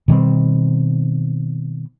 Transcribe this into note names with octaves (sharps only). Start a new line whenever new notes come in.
B2 D#3 G3 C4